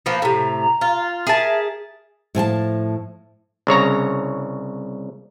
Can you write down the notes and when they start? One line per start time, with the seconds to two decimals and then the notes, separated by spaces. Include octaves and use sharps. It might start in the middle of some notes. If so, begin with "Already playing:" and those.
0.06 F3 A#3 B3
0.22 A2 C3 A#5
0.81 F4
1.27 G#4 A#4 E5 A5
2.35 A2 F3 G#5 A5
3.67 C2 C#3 C#5 A#5